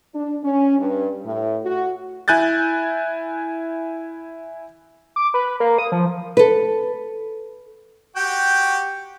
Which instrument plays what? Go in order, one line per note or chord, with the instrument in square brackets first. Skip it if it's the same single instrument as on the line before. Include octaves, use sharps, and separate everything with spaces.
[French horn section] D4
C#4
G2
A2
F#4
[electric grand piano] E4 G#5 F#6 G6 A6
[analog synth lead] D6
B4
A#3
D#6
F3
[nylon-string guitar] A4 B4
[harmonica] F#4 G4 G5